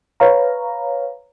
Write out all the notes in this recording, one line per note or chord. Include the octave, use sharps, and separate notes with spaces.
B4 C#5 F5 A#5